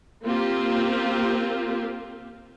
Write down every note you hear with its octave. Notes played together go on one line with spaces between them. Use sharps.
A#3 C4 F4 G4